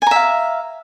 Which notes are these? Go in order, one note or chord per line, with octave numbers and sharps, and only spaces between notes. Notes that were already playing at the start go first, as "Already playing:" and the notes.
E5 F5 G#5 A#5